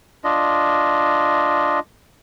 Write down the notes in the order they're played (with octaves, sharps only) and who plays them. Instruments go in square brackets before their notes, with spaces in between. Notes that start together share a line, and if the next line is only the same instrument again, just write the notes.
[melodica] D4 F4 D#5